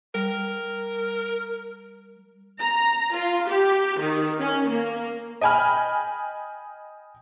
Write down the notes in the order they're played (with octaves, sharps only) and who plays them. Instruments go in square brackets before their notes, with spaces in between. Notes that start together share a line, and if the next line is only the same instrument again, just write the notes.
[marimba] G3 [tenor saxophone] A#4
[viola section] A#5
F4
G4
D#3
C#4
A#3
[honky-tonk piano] D#5 G5 G#5 B5 F6